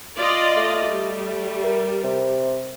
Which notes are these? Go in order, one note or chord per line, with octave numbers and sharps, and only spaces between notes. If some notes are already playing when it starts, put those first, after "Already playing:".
F4 D5 D#5
A3
G3
A#4
C3